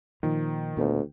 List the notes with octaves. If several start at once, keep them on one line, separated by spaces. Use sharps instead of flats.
A#2 D#3 F3
D2 A#2 B3